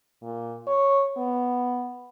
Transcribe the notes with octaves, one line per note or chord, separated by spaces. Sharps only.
A#2
C#5
B3